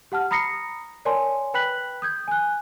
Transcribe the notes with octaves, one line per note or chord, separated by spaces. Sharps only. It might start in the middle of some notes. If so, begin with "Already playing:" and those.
G4 F#5 A5 F6
A#5 B5 D#6 A#6 C7 C#7
A#4 C#5 D5 G#5 A5 C6
B4 G5 B5 F#6 B6 F#7
D#6 G6 G#6
G#5 F#6